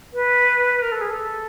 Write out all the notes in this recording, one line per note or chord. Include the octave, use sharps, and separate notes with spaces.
B4
A#4
A4
G#4
A4